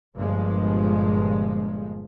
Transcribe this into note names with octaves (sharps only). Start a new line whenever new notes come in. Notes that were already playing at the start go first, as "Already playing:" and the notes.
G1 G2 A#2 F3 G#3